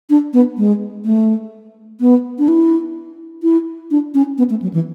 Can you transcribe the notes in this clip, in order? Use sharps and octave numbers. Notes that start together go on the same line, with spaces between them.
D4
B3
G#3
A3
B3
D4
E4
E4
D4
C#4
B3
A3
F#3
E3